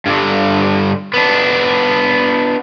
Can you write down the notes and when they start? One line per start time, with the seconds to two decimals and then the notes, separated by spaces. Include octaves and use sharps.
0.06 G2 D3
1.14 B3 D4